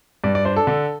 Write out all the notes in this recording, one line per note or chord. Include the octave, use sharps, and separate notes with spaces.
G2 D5
D5
D4 C5
A4
D3